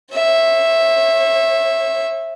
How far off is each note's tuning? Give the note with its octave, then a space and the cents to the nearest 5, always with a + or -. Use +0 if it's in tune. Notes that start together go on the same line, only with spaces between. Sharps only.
C#5 -45 E5 +0